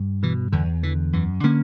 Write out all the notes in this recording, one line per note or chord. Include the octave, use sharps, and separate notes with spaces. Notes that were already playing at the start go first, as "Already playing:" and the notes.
Already playing: G2
B2 E3
E2 D3
D3 E3
F#2 E3
D3 A#3 C#4